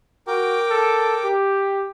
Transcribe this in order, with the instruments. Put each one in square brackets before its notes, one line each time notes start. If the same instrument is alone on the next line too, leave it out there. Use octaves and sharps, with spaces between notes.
[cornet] F#4 [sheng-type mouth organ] A#4 G5 D6
[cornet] A4
G4